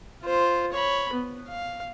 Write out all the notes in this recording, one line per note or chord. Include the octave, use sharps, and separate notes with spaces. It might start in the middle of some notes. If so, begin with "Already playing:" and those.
F4 C5
C#5 B5
B3
F5